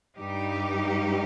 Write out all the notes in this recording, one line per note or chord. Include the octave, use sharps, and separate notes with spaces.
G2 G3 D#4 G4